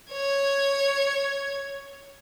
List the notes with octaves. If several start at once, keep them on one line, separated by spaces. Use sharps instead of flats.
C#5 G#6